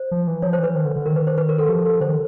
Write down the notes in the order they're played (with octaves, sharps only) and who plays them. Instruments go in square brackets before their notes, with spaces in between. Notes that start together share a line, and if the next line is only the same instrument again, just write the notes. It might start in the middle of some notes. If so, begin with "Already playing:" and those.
Already playing: [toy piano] C5
[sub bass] F3
E3
[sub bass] F3 [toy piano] C#5
[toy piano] C5
[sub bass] E3
[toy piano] B4
[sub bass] D#3
D3
D3
[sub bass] D#3 [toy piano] A#4
[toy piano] B4
C5
B4
A#4
A4
[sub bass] F3 [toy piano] G4
[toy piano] A4
[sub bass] D3 [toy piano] C5
[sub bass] D#3